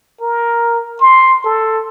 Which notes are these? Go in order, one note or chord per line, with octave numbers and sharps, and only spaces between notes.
A#4
C6
A4